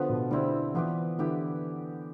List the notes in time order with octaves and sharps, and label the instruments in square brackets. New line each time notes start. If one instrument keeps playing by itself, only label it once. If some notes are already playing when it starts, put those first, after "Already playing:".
Already playing: [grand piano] D3 [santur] F3 B3 F4 B4
[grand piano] B2
[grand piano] D3 [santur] G3 C4 E4
[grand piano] E3 [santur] B3 F4 B4 D5
[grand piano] D3 [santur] E4 G4 B4